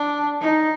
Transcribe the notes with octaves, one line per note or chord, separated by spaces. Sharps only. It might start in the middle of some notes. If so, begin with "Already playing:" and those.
Already playing: D4
D#4